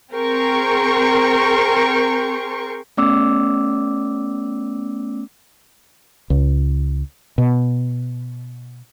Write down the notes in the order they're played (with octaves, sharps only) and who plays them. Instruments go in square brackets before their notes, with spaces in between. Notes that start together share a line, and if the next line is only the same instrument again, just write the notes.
[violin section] C4 G#4 A#4 G5 C6 C#6
[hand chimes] A3 B3 C#4 D5 D6 E6
[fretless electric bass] C#2
B2